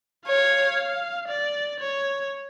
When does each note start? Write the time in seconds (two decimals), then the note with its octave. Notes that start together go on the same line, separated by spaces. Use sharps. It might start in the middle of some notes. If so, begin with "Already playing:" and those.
0.28 C#5 F5
1.28 D5
1.80 C#5